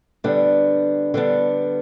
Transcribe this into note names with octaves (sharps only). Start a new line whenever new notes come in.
D3 G3 B3 D4
D3 G3 B3 D4